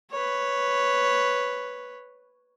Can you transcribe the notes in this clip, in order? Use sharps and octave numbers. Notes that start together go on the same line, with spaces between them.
B4 C#5